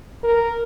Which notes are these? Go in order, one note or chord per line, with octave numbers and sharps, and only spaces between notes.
A#4